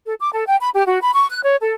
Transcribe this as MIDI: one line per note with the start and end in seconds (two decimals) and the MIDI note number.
0.06 0.14 69
0.19 0.29 86
0.33 0.44 69
0.47 0.56 79
0.60 0.69 83
0.73 0.83 67
0.86 0.99 66
1.02 1.11 83
1.13 1.29 85
1.30 1.40 90
1.44 1.56 73
1.61 1.73 69